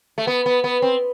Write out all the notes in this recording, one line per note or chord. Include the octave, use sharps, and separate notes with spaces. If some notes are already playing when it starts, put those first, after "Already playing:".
A3
B3
B3
B3
C4